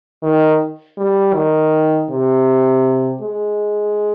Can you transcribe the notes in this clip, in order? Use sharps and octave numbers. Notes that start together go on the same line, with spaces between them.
D#3
G3
D#3
C3
G#3